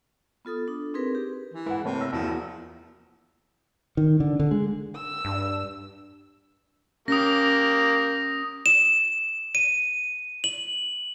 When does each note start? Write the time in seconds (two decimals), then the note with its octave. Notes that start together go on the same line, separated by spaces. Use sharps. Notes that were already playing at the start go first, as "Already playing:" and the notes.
0.45 B3 F4 A4 D#6
0.68 D4
0.94 C4 D#4 G#4 A#4 B4
1.15 G4
1.54 E3
1.66 G#3 E4 G#4 B4 F#5
1.85 C3 A3 A#3 B4 C#5 A5
2.01 E6 A#6
2.13 E2 F3 E4 F#4 A#4
3.97 D#3
4.20 D3
4.40 D3
4.51 G#3
4.95 E6
5.25 G2 D4
7.08 A#3 C#4 G4 D#6 A#6
8.66 E7
9.55 D#7
10.44 F#7